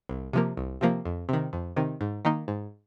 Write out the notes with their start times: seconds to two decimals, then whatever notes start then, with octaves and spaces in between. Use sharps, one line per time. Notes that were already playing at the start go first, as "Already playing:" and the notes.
0.09 C2
0.33 C3 F3 A#3
0.57 C2
0.81 C3 F3 A#3
1.05 F2
1.29 C3 D#3
1.53 F2
1.76 C3 D#3
2.01 G#2
2.25 D#3 A#3 D#4
2.48 G#2